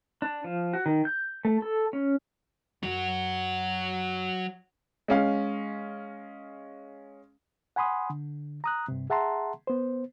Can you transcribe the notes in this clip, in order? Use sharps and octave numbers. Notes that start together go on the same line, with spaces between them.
D4
F3
F#4
D#3
G6
A3
A4
C#4
F#2 F#3 F#4
G#3 C#4 F5
F#5 G#5 B5 C6 D#6
D3
A#5 D#6 F#6
G2 C3
G#4 E5 F#5 A5 A#5 C6
B3 C5